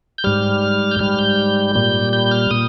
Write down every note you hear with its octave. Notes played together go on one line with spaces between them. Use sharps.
G6
G#2 G3 F6
G6
G#2 G3 F6
G6
A#2 G3
G6
F6
A#2 D#6